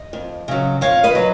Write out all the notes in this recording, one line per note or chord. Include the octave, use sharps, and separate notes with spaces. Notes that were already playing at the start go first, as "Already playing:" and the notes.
Already playing: D#5
F2
C#3 F#3
F2 C#5 F5
B4 D#5
F#3